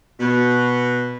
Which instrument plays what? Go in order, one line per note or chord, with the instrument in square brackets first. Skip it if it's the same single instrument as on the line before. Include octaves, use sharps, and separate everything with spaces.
[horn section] B2